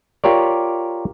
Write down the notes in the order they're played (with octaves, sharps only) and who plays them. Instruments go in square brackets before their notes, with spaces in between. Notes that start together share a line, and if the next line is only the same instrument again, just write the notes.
[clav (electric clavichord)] F4 G4 A#4 C#5 D5